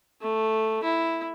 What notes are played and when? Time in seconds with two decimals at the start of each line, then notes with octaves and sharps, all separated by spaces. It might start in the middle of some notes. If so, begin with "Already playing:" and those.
0.22 A3
0.84 E4